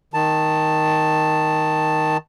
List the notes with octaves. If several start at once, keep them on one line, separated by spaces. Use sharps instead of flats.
D#3 A5